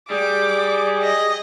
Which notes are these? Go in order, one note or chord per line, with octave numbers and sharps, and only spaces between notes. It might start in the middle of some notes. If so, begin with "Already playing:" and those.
G3 G#4 D6
D#5